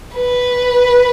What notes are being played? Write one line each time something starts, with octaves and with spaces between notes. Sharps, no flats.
B4